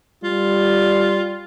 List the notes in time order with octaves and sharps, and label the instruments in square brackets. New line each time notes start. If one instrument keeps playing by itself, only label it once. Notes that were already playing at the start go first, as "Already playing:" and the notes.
[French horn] G3 [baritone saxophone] F4